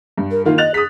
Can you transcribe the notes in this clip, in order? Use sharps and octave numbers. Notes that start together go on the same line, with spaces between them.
G2
A#4
D#3 A#3 D#4 F4
D#5 F#6 A6 F7
G#4 D#6 B6